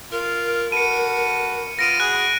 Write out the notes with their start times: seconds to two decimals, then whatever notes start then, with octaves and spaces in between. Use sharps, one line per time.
0.12 F4 A#4
0.72 F#4 A4 B4 C#7 D#7
1.79 B3 F4 A#6 D7 D#7
2.00 E4 F#4 G#4 F#6